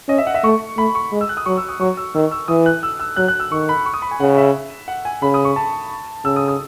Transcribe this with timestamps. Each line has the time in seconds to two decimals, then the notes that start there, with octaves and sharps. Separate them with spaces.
0.08 C#4 D#5
0.18 E5
0.27 F#5
0.34 E5
0.44 A3 C#6
0.77 A3 B5
0.95 C#6
1.12 G#3
1.21 E6
1.29 F#6
1.37 D#6
1.46 F#3 C#6
1.57 E6
1.69 D#6
1.80 F#3 C#6
1.97 E6
2.14 D#3 E6
2.31 E6
2.48 E3 D#6
2.66 F#6
2.83 E6
3.00 E6
3.16 F#3 F#6
3.28 F#6
3.40 E6
3.51 D#3 C#6
3.69 B5
3.86 C#6
3.94 D#6
4.02 B5
4.11 G#5
4.20 C#3 F#5
4.37 E5
4.88 F#5
5.05 G#5
5.22 C#3 B5
5.34 D#6
5.45 C#6
5.56 A5
6.25 C#3 E6
6.36 D#6
6.48 D#6